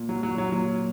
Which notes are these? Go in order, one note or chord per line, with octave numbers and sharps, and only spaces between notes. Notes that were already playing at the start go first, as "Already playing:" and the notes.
Already playing: A#2
F#3
F#3
F#3
A#2 F#3